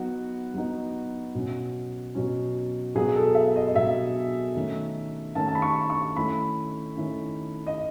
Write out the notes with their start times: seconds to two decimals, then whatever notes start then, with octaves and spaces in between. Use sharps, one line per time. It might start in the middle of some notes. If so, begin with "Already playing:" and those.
Already playing: F#3 B3 D#4 F#4
0.54 F#3 B3 D#4
1.35 B2 F#3 C#4
2.15 B2 F#3 C#4
2.95 B2 F#3 B3 G#4
3.15 A4
3.35 E5
3.56 D#5
3.67 D#5
3.75 B2 F#3 B3 E5
4.55 D#3 A3 C#4
5.35 D#3 A3 C#4 A5
5.48 A5
5.55 B5
5.62 C#6
5.90 C#6
6.16 D#3 A3 C#4 E4 B5
6.97 D#3 A3 C#4 E4
7.67 D#5